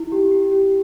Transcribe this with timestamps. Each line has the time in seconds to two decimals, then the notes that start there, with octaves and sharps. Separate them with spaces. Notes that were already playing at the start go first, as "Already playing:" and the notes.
Already playing: E4
0.12 G4
0.31 G4
0.52 G4